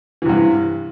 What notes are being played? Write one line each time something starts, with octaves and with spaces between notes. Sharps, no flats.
G2 C3 E3